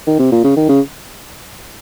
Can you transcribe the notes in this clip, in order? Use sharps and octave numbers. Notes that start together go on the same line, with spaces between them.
D#3
C3
A#2
C#3
D#3
C#3